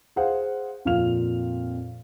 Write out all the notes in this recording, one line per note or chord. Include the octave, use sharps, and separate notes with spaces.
G#4 C5 F5 F#5
F2 A#2 F5 F6 F7